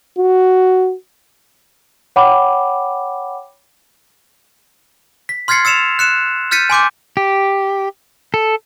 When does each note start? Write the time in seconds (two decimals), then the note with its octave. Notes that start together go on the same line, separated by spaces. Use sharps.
0.18 F#4
2.16 C#5 F#5 G5 B5 D6
5.29 B6
5.48 C6 F6 G#6 A6 C7 C#7
5.65 E6 A6 C#7 E7 F7
5.99 F#6 C#7 E7
6.51 F6 G6 A6 B6 C#7 D#7
6.70 G#5 C6 D6 G6
7.17 G4
8.34 A4